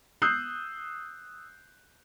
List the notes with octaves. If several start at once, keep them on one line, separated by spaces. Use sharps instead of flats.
D#6 E6 F#6 G6 C7